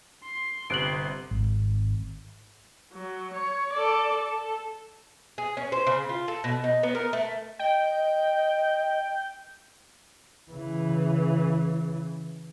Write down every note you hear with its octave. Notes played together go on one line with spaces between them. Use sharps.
C6
G1 C3 F#6 D7 F#7
G#1
F#3
C#5
A4 D5
A4
G#4
C#4
C5
C#3
F4
A4
B2
D#4
B3
A#4
A3
D#5 G5
C#3 E3